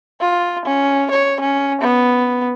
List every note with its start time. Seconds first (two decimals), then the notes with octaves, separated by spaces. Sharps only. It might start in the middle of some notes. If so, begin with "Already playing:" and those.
0.21 F4
0.66 C#4
1.11 C#5
1.41 C#4
1.81 B3